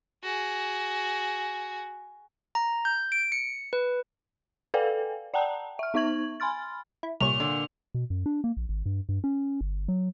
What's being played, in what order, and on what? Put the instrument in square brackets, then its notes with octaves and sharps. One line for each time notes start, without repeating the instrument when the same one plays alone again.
[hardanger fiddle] F#4 G#4
[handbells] A#5
G6
D7
C#7
B4
[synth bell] A4 B4 D5 F5 G5 G#5
D5 F#5 G5 A5 A#5
E5 F6
B3 D#4 E5 C#6 G#6 F#7
G#5 B5 C6 F6 A6
[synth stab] E4
[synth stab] C2 C#5 [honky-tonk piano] A#2 [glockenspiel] F7
[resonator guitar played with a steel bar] D3
[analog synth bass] B2
F#2
D4
A#3
A#1
G#1
G2
G2
C#4
G1
F#3